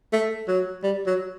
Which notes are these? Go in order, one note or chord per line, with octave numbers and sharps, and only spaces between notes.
A3
F#3
G3
F#3